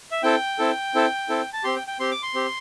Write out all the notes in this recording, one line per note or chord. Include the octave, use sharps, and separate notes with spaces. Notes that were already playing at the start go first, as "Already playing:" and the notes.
E5
C4 E4 A4 G5
C4 E4 A4
C4 E4 A4
C4 E4 A4
A5
C4 G4 C6
G5
G5
C4 G4 C6
D6
C6
C4 G4